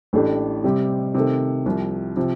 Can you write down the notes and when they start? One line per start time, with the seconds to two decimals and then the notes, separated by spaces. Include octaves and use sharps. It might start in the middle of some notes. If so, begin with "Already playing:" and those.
0.13 A1 A2 A3 D4 G4
0.64 C3 G3 C4 G4
1.15 C3 D#3 A3
1.66 C2 C3 F3
2.17 C3 F3